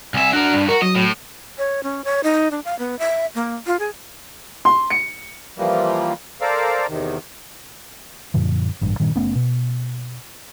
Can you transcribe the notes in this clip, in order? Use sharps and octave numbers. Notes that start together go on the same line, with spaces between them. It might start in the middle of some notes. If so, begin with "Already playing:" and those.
C2 E5 G#5
D4 F#4 A#4
G2
F#4 A#4
F#3 D#5
A2
C#5
C#4
C#5
D#4
D4
F5
B3
E5
A#3
F4
G#4
C6
C#7
E3 F3 G3 A#3
A4 A#4 C5 D5 F5
E2 C3 D#3
F#2 A#2 D3 F3
A1 G2
G2 A#2 D#3
F#1 A3 B3 C#4
B2